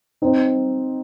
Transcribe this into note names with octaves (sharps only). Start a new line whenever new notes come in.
C4 D#4